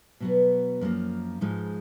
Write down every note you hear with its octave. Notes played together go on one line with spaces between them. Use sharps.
B2 F#3 B3
F#2 F3 A#3
G#2 F3 G#3 D#4